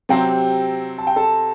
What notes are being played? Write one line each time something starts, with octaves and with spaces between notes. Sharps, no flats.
C3 F#3 C4 G4 G5
A5
G5
A4 A5